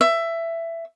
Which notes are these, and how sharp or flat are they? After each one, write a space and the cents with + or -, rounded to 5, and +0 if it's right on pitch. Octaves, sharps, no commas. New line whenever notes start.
E5 +15